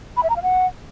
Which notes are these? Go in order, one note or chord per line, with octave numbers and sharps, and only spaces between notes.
B5
E5
A#5
F5
F#5